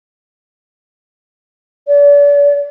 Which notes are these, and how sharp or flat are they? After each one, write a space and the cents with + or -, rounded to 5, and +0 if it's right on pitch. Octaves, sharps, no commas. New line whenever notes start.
D5 -40